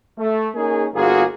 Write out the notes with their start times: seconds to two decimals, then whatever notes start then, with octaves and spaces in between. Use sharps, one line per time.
0.18 A3
0.54 A#3 C#4 D#4 G#4
0.94 G1 A#3 F4 F#4 G#4